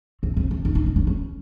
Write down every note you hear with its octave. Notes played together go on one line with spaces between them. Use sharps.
C4
C4
C#4
D#4
D#4
D#4
D4
C#4